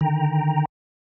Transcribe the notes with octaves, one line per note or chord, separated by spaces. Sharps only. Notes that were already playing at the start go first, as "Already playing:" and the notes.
D3 D#3 G5 A#5